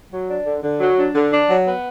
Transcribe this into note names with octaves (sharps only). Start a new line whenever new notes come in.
F#3
D4
D3
D3
F#3
D4
D3
D4
F#3
B3